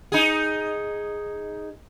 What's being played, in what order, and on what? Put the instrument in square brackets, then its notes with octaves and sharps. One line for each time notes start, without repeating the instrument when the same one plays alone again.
[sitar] D#4 G#4